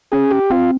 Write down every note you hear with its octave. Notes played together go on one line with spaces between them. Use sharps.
C#4 G#4
G4
C4 F4